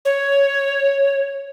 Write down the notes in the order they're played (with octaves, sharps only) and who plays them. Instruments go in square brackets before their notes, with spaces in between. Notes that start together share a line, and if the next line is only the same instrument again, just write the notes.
[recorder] C#5